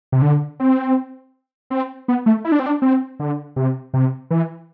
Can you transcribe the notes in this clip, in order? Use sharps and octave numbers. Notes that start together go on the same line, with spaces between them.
C3
D3
C4
C4
B3
A3
E4
D4
C4
D4
C4
D3
C3
C3
E3